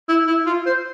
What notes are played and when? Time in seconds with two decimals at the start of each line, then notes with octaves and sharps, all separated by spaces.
0.08 E4
0.27 E4
0.46 F4
0.66 C5